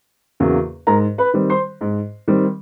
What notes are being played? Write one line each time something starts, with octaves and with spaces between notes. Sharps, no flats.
E2 C#3 F#3 A#3
G#2 A#4 A#5
B4 B5
D#3 G3 C4
C5 C6
G#2
D#3 G3 C4